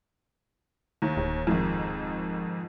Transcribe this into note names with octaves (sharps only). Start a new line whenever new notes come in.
D#2
D1
F2 G#2 D#3